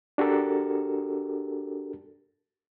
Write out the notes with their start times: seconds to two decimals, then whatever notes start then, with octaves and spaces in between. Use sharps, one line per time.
0.18 D4 F#4 G4 A4 A#4